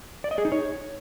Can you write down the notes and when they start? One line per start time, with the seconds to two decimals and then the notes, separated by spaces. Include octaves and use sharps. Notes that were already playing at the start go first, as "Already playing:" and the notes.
0.24 D5
0.31 D#5
0.38 G#4
0.45 D#4
0.52 C#5